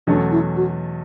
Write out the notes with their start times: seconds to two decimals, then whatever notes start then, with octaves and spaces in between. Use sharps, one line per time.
0.07 E2 B2 F#3 A3 C#4 D4
0.31 E4
0.56 F#4